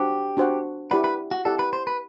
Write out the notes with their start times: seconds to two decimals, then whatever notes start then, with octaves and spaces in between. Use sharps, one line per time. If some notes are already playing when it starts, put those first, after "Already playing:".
Already playing: D4 F#4 G4 C5 F#5
0.37 D4 F#4 C5 F#5
0.91 E4 G4 B4 D5 F#5
1.04 B4
1.31 F#4
1.45 E4 G4 A4 D5 F#5
1.59 B4
1.73 C5
1.87 B4